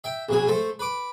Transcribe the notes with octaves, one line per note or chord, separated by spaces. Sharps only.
E5 G5
A#1 B2 G#4
A3 A4 C5
B4 D6